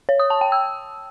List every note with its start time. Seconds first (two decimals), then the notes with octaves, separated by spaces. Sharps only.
0.09 C#5
0.20 D#6
0.30 A5
0.41 G5
0.52 E6